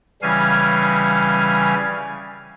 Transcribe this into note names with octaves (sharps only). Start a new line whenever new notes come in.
C#3 E3 G3 C#4 F5 G#5